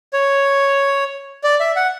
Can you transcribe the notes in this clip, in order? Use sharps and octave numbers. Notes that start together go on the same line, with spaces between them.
C#5
D5
E5
F#5